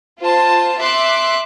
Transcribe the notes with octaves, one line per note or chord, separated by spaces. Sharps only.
F4 C5 A5
E5 C6 D6 F#6